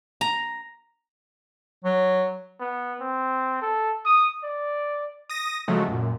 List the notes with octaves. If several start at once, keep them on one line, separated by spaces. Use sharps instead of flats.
A#5
F#3
B3
C4
A4
D#6
D5
D#6 A#6
C#3 F3 F#3 G#3 A3
F#2 A#2